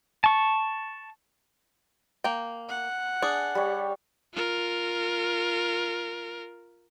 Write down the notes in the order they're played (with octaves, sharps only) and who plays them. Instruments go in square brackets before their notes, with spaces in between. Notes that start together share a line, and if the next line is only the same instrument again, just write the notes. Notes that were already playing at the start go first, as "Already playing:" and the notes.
[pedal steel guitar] A5 C#6
[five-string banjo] A#3 G5
[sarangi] F#5
[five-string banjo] D4 G#4
[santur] G3 C#5
[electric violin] F4 A#4